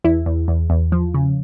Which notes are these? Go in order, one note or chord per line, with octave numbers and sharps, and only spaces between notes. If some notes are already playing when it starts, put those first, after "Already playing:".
E2 E4
E2
E2
E2
F3
C#3